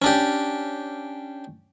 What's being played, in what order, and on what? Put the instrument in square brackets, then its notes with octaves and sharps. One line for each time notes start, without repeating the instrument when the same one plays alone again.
[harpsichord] C#4 D4 G4